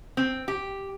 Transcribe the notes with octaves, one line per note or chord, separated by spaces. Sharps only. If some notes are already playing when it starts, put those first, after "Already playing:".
C4
G4